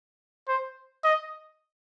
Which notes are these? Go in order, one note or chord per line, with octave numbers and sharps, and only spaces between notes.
C5
D#5